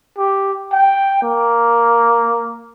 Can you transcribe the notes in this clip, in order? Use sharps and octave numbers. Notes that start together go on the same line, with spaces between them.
G4
G5
A#3